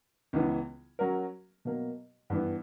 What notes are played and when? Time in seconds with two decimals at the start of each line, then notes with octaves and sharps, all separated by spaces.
0.33 C#2 C#3 E3 B3
0.99 F#3 C#4 F#4 A#4
1.65 B2 F#3 A#3
2.30 G2 E3 B3